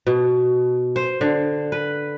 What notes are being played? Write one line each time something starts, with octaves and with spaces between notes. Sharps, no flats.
B2
C5
D3
B4